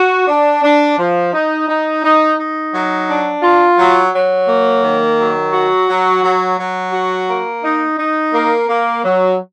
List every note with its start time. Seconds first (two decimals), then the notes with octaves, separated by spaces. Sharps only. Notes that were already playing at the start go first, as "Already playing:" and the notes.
Already playing: F#4
0.27 D4
0.63 D4
0.98 F3
1.33 D#4
1.68 D#4
2.04 D#4
2.39 D#4
2.74 F#3
3.08 D4
3.43 F4
3.78 F#3
4.13 F#3
4.48 A#3
4.83 D#3
5.18 F#3
5.53 F#4
5.88 F#3
6.23 F#3
6.58 F#3
6.93 F#4
7.28 A#3
7.64 D#4
7.98 D#4
8.33 A#3
8.69 A#3
9.04 F#3